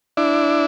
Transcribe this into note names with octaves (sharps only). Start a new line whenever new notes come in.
D4 E4